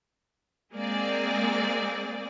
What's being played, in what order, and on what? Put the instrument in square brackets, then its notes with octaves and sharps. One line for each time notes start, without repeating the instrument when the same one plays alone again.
[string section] G#3 A#3 C4 G#4 D5